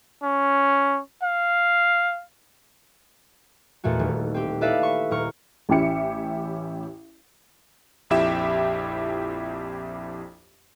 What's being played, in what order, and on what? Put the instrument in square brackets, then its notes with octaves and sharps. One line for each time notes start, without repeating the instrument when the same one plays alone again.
[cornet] C#4
F5
[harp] E2 A#2 A3 F#4
D#1
C4 G4
E4 A4 B4 D5 E5 F5
C#6
D#1 A#4 C#6
[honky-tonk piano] A1 C#4 E4 G4 E5 C#7
[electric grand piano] A#1 F2 E4 G4 E5 E7